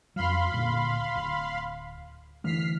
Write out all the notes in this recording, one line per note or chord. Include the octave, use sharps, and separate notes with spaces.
F2 F#3 F5 B5 C6
D1 A#2 D3
D1
D3 E3 A3 F6 B6 C7